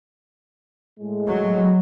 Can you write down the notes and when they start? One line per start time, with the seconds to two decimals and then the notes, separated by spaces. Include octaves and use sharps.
1.00 A2 G#3
1.28 F#3